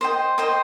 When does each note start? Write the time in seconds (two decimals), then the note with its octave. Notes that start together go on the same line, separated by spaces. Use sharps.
0.01 C5 D#5 G5
0.38 C5 D#5 G5